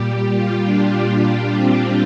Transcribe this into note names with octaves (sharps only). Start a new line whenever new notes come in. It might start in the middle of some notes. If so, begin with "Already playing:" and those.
Already playing: A#2 G3 G4
F4
D4
D4
C4